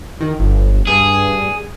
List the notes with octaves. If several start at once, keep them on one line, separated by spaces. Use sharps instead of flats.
D#3
G1
G2 G#4